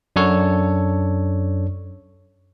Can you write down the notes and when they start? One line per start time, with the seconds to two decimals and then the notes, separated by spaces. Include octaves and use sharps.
0.16 F#2 D4 A4 C#5